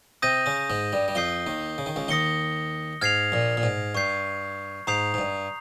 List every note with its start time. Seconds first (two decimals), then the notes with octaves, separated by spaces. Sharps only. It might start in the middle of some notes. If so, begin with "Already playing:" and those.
0.22 C3 C4 D#6 G6 A#6 D#7
0.46 C#3 C#4
0.70 G#2 G#3
0.93 G2 G3
1.08 G3
1.15 F2 F3 D#6 G6 C7 G7
1.46 D#2 D#3
1.78 C#3
1.86 D#3
1.96 C#2 C#3
2.08 D#2 D#3 D#6 A#6 C#7 G7
3.01 G#2 F6 G#6 C7 F7
3.32 A#1 A#2
3.57 A#2
3.63 G#2
3.95 G2 C#6 G6 C7
4.87 G#2 A#5 D#6 G6 C7 F7
5.14 G#2
5.18 G2